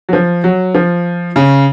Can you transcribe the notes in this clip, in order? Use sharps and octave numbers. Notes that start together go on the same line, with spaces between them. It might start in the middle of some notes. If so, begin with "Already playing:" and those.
F#3
F3
F#3
F3
C#3